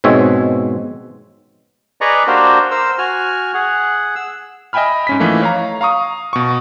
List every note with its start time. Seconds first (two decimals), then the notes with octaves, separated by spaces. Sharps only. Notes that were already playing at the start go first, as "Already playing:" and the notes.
0.04 G#2 B2 G#3 C4 C#5 E5
2.01 G#4 B4 D5 D#5 A#5 C#6
2.27 A#3 D4 F#4 G4 A#4 C5
2.71 A#4 C5 E6
2.98 F#4 G#5 F6
3.54 G#4 F#5
4.16 E6
4.73 D#5 E5 G5 G#5 B5 F6
5.07 G#2 C#4 B6
5.20 E3 F3 A3 A#3 D#4
5.41 C#5 F5 A#5
5.81 F5 A#5 C#6 D#6
6.33 B2 C#6